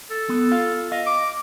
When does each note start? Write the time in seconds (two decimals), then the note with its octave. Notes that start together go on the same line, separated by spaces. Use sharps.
0.10 A4
0.29 B3
0.52 F4 F5
0.92 D#5 F5
1.06 D6